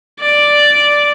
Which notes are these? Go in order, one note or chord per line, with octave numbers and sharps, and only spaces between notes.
D5